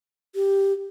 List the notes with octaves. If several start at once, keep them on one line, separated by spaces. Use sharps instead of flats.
G4